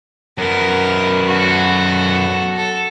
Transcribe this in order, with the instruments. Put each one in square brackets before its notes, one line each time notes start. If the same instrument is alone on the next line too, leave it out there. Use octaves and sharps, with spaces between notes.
[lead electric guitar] F#2 B3 [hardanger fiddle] A#4
[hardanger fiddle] F#4 A4
A4